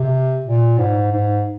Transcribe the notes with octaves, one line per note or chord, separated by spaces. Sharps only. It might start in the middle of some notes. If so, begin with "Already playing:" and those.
Already playing: C3
A#2
G#2
G#2